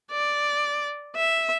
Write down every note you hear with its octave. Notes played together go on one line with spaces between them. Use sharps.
D5
E5